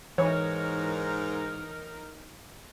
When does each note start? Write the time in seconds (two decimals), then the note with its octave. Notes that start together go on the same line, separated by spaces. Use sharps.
0.18 G#2 E3 D#4 A#4 C#5